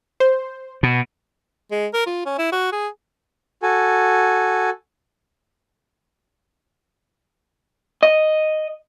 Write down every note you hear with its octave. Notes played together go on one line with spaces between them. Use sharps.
C5
B2
G#3
A#4
F4
C#4
E4
F#4
G#4
F#4 A4 G#5
D#5